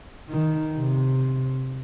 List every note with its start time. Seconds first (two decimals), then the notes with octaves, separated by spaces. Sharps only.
0.30 D#3
0.77 C3